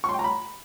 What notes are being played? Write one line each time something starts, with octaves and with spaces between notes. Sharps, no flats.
C#6
C6
G5
A#5
B5